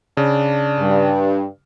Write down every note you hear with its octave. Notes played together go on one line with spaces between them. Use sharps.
C#3 D4
G2